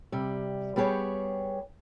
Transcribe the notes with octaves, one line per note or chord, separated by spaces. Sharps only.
C3 G3
G3 B3 G4 G#4 C#5